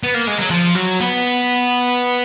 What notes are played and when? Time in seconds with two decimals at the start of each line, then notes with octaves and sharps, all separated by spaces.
0.03 B3
0.15 A#3
0.27 G#3
0.38 F#3
0.50 F3
0.75 F#3
1.00 B3